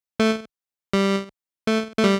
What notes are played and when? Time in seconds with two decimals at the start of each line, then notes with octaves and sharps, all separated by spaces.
0.20 A3
0.93 G3
1.67 A3
1.99 A3
2.04 G3